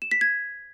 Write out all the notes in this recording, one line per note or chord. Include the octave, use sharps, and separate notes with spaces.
E7
B6
G#6